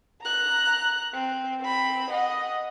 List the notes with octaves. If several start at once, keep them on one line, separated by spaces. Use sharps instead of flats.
A#5 F#6
C4
C4 B5
D#5 F#5